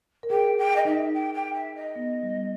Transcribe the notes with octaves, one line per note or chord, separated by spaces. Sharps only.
A#4
G#4 G5
G5
D#5
D#4 E5
G5
G5
E5
D#5
B3
G3